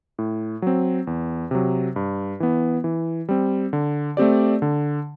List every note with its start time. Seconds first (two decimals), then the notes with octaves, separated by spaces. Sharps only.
0.18 A2
0.62 F#3 C4
1.07 E2
1.51 C3 F#3
1.96 G2
2.40 E3 B3
2.84 E3
3.29 G3 C4
3.73 D3
4.17 A3 C4 G4 D5
4.62 D3